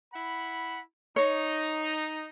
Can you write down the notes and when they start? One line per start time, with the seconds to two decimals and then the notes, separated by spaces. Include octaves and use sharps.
0.14 E4 F#5 B5
1.16 D#4 C#5